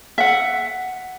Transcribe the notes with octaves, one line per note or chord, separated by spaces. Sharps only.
E5 F#5